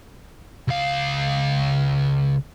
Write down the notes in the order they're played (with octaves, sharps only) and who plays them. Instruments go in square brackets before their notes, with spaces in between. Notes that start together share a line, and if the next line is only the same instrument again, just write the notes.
[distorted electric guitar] C#2 F5